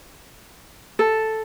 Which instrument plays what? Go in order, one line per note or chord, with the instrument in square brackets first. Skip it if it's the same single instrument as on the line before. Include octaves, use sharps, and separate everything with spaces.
[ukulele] A4